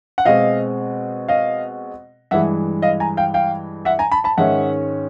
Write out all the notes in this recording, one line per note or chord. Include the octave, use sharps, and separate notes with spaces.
F#5
B2 G#3 C4 D#5 F5
D#5 F5
G2 E3 G#3 E5 F#5
D#5 F5
G#5 A#5
F5 G5
F5 G5
E5 F#5
G#5 A#5
A5 B5
A5 B5
G#2 D#3 G#3 C#4 E5 F#5